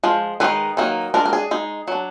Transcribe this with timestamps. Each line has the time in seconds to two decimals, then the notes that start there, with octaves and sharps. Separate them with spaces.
0.04 F3 G#3
0.40 D#3 G#3 D#4 B4
0.77 D#3 F#3 A#3 D#4
1.14 G#3 D4 A#4
1.25 A#4
1.33 G#4
1.51 G#3 D#4
1.88 F#3 D4